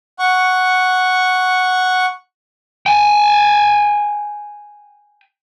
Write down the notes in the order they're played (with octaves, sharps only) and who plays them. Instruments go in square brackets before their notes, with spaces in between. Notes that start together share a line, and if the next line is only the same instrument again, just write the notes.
[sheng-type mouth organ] F#5 C#6
[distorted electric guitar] G5 G#5